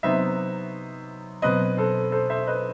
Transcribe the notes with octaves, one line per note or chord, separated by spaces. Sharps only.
C3 F#3 B3 D#4 C5 E5
B2 F#3 C4 B4 D#5
A4 C5
A4 C5
C5 E5
B4 D#5